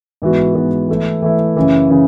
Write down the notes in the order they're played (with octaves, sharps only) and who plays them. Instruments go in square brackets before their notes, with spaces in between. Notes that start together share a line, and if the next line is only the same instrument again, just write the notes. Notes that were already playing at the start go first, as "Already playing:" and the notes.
[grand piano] G#2 E3 B3 F#4
G#2 E3 B3 F#4
E3 A3 E4
E3 A3 E4
F#2 C#3 E3
C#3 E3